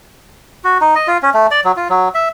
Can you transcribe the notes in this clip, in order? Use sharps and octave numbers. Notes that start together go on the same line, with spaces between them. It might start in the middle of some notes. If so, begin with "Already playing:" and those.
F#4
D#4
D#5
F4
C#4
A3
D5
F#3
F4
F#3
E5